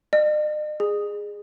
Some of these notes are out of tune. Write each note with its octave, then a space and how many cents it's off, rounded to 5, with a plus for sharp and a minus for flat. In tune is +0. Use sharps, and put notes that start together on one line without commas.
D#5 -45
G#4 -10